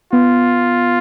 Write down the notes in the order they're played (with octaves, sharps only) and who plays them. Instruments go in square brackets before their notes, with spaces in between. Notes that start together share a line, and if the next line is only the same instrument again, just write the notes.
[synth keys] B3 [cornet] F4